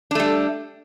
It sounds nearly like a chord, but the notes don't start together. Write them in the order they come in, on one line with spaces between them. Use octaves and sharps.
D4 A3 G3